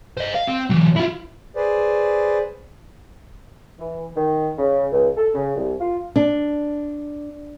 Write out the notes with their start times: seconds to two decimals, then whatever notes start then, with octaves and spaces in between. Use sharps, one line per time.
0.18 C5 D#5
0.35 F5
0.48 C4
0.70 E3 F#3
0.96 E4 F4
1.56 G#4 B4 C5 D5
3.79 E3
4.16 D#3
4.58 C#3
4.92 C#2
5.17 A4
5.34 C#3
5.56 C2
5.80 F4
6.16 D4